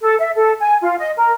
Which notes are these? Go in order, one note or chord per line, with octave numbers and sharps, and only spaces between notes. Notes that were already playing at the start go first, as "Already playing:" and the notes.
A4
E5
A4
G#5
F4
D#5
A#4